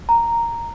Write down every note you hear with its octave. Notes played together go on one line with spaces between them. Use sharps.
A#5